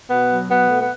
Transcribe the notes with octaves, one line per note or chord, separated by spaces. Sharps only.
B2 B3
F#3
B2 B3
A3
B3